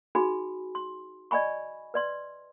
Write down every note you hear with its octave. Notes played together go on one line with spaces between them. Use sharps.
D#4 F#4 G#4 G#5 B5
C6
D5 D#5 G#5 B5 C#6
B4 D5 C6